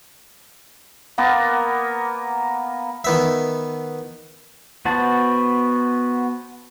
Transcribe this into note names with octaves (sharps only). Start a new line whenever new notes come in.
A#3 B3 A#4
D#3 B3 E5
B3 F#4 C5 A5